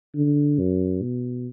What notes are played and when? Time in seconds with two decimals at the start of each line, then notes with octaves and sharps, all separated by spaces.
0.15 D3
0.59 F#2
1.02 B2